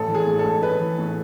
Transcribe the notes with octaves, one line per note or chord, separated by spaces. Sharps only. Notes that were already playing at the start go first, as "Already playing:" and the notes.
Already playing: A1 A4
E3
G#4
A2
A4
A1
A1 B4
E3
A2